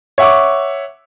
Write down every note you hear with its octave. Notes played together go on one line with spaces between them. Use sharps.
C#5 E5 F#5 C#6 D6